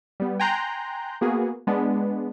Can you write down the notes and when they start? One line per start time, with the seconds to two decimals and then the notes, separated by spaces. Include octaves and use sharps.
0.20 G3 B3
0.40 G5 G#5 A#5 C6 F#6 G6
1.21 A#3 B3 F#4 G#4
1.67 G#3 B3 D4